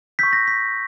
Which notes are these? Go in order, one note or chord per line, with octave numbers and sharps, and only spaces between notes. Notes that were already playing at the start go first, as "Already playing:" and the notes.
C#6 E6 G6 B6
A#6
B6